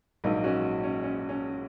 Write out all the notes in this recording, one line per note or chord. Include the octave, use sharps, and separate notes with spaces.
A#1 G#2 F#3 A#3 D#4
C#4 F#4
C#4
C#4
C#4